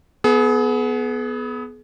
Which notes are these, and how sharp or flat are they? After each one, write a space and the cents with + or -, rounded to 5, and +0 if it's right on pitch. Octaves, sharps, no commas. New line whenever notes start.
B3 +0 G#4 +35